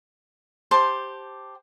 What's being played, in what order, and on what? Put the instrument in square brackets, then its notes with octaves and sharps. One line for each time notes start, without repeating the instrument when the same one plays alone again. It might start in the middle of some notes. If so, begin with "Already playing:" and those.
[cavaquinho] G4 C5 A5